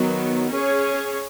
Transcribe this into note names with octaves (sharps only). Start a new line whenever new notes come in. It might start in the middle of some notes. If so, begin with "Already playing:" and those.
Already playing: D#3 F#3 B3
C#4 G#4 C#5